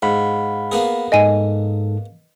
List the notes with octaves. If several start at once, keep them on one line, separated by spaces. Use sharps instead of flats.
G#2 F5 F#5 B5
A#3 B3 G#4
G#2 A4 D#5 G#5 D#7